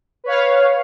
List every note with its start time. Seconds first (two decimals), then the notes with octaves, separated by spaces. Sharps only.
0.24 B4 C#5 F5